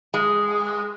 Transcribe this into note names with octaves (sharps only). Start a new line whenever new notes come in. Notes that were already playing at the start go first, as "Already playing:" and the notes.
G#3